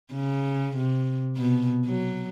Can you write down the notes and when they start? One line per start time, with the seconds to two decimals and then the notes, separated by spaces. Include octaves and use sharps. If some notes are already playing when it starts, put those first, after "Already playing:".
0.14 C#3
0.76 C3
1.36 B2
1.85 F#3